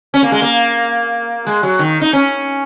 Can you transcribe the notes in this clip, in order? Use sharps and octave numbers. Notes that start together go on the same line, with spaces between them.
C#4
A#3
G#3
A#3
G#3
F#3
D#3
D#4
C#4